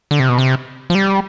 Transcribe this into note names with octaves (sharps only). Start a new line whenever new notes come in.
D3
C3
B2
C3
F3
G3